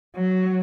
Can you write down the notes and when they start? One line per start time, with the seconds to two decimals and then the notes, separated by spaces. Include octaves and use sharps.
0.16 F#3